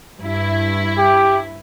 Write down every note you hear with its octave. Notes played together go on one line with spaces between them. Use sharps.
G2 E4
G4